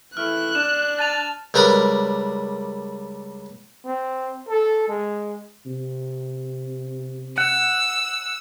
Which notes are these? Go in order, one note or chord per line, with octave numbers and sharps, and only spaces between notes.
E3 A3 E4 F6 F#6
D4 E7
A5 A6 D#7 F7
C#2 G3 A#4 B4 A#5 D#6
C4
A4
G#3
C3
F#5 E6